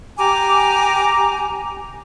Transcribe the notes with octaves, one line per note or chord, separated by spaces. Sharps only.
G4 G#5 A#5 D6